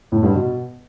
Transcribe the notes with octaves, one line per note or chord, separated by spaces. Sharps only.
A2
G2
B2